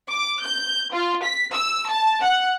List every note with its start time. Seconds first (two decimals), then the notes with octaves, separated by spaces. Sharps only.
0.11 D6
0.44 G6
0.93 F4
1.24 B6
1.54 E6
1.90 A5
2.24 F#5